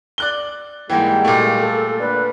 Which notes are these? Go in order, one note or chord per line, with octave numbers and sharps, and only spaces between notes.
D5 F#6 G7
G#2 E3 G3 G#3 A#3 G5
A#2 A3
A4
D3 A#3 B4 D5